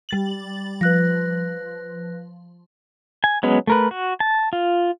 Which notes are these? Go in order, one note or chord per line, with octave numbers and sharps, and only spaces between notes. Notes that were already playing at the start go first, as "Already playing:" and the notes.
G3 A6 F#7
F3 B4 F#6 A#6
G#5
F#3 G#3 B3 C#4
A3 A#4 B4
F#4
A5
F4